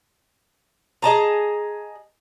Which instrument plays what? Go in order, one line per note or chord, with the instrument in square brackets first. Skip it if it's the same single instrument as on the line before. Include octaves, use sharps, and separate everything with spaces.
[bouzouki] G#4 D#5 A5 A#5